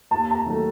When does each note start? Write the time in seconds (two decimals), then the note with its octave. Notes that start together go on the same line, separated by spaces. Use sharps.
0.11 D#2 A5
0.31 A5
0.35 A#5
0.46 D#3 F#3 A3